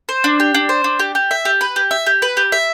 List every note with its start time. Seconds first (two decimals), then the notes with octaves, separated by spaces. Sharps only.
0.09 C5
0.24 D4
0.40 G4
0.54 D4
0.69 C5
0.84 D4
0.99 G4
1.15 G4
1.31 E5
1.45 G4
1.61 B4
1.76 G4
1.91 E5
2.06 G4
2.22 B4
2.37 G4
2.52 E5